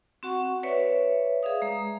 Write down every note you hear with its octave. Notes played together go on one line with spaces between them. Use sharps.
C4 F#4 F#5 C#6
B4 C#5 D5 E5
G#4 E5 F5 D#6
G#3 A#5